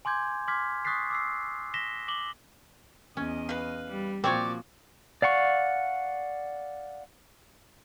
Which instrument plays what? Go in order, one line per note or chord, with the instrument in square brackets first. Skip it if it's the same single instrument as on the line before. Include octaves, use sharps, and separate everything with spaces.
[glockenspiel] G#5 C6 D6 G6 G#6
C6 D6 F6 G#6 B6
C#6 D#6 F#6 A6 B6 C7
D6 E6 C7
A#6 B6 E7 G7
D6 F#7 G7
[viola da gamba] E2 D#5 [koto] C#4
[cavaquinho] B4 F5
[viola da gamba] G3
[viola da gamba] A#2 F3 F#4 [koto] C4 C#5 [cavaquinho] D5 C#6
[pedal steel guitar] D5 F5 F#5 C#6